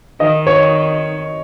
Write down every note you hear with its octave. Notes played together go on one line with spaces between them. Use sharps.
D#3 D#5
C#5